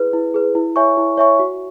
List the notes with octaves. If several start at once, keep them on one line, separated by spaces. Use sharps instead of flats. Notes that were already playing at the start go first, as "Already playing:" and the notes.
Already playing: E4 G#4 B4
E4
G#4 B4
E4
C#5 E5 G#5 C#6
E4
C#5 E5 G#5 C#6
F#4